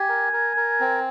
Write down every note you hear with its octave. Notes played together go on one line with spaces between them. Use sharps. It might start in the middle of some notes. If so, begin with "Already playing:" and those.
Already playing: G4 G#5
A#4
A#4
A#4
C4